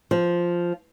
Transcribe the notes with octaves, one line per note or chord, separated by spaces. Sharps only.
F3